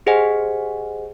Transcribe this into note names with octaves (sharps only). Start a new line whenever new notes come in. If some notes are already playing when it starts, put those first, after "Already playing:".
G4 G#4 C5 D#5 F#5 G#5